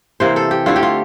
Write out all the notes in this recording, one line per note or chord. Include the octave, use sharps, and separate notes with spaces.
C3 E3 A#3 C5
A4
G4
D3 A3 C4 E4 F4
G4
F4